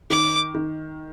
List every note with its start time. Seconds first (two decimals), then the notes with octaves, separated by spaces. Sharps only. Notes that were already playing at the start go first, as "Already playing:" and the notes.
0.10 D#3 D6
0.55 D#3